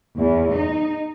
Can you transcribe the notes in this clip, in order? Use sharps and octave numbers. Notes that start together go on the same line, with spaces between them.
E2
D#4